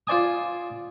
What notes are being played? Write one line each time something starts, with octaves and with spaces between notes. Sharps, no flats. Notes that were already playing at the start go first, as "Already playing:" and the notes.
F4 C5 D5 G#5 D#6